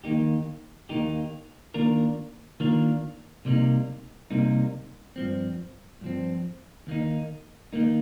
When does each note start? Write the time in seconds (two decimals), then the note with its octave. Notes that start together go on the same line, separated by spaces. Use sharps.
0.04 D#2 D#3 A#3 D#4 G4
0.89 D#2 D#3 A#3 D#4 G4
1.74 D#3 A#3 D4 F4 A#4
2.60 D#3 A#3 D4 F4 A#4
3.45 C2 C3 G3 A#3 D#4
4.31 C2 C3 G3 A#3 D#4
5.16 G2 F3 C4
6.01 G2 F3 C4
6.87 D#2 D#3 A#3 D#4
7.73 D#3 A#3 D#4